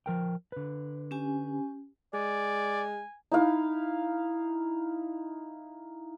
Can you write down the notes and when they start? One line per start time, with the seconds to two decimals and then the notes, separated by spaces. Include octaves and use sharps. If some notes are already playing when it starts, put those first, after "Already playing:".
0.06 F3 A#4 G5
0.52 D3 B4
1.11 C#4 G4 G#5
2.14 G#3 D5 G#5
3.32 D#4 E4 F5